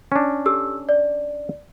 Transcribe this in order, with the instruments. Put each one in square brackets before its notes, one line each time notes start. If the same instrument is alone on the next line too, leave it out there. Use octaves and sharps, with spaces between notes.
[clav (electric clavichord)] C#4 D4
[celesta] G4 A4 E6
D5